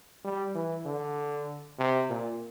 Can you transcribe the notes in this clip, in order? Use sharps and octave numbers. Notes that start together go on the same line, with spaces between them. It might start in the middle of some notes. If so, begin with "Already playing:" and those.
G3
E3
D3
C3
A#2